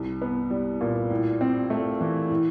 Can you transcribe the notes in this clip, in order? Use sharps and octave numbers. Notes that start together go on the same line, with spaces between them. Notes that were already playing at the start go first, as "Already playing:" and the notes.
Already playing: C2
B3
G3
A#2
A2
C4
A3
E3
A2